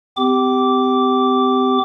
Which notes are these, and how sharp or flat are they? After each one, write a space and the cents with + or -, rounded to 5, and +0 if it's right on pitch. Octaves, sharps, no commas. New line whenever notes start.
C4 -40 G4 +0 D6 -10